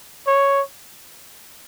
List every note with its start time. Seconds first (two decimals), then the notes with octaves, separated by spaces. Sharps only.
0.27 C#5